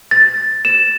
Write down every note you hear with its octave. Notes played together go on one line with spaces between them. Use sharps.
A6
E7